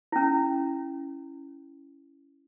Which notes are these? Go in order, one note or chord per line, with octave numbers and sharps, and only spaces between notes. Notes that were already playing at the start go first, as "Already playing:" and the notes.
C#4 E4